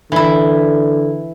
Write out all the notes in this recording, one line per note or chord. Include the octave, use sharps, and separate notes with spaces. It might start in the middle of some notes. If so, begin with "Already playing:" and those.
D3 E3 E4